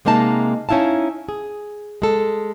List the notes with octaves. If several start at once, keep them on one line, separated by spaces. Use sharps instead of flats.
C3 G#3 A#3 D#4 A5
C#4 D#4 E4 F5 A5
G#4
G#3 A4